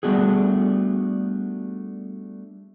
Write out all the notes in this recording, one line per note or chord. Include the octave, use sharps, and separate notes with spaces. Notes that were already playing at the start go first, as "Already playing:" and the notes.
G3 A3 B3 D4 F#4 G#4